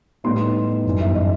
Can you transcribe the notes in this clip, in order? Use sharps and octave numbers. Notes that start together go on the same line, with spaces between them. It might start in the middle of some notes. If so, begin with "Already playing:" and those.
A2 G3 B3 D#4 C6
G1 F#2 E3 G3 D#4
E5
D#5